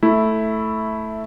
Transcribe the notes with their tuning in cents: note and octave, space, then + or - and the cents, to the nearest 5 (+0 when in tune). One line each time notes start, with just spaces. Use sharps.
A3 +0 E4 -5